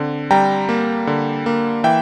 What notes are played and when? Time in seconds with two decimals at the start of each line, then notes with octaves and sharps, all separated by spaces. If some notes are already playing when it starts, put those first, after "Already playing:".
Already playing: D3 C4
0.31 G3 G5 A#5
0.69 A#3
1.07 D3
1.46 A#3
1.84 E3 E5 G5